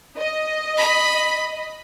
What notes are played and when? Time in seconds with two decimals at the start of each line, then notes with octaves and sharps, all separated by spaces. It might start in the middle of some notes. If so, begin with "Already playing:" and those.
0.18 D#5
0.77 B5